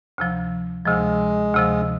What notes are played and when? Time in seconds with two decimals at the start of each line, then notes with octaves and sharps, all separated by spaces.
0.18 D2 C3 F3
0.85 D2 C3 F3 G#3
1.54 D2 C3 F3